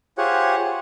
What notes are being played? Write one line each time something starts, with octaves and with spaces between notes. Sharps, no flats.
F4 G4 G#4 C5 C#5 F#5